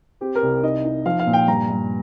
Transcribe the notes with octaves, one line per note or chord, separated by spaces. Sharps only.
C4 G4
A#4
C2
D#4 D#5
D#4
F3 F5
F5
A#2
G5
G2 A#5
G2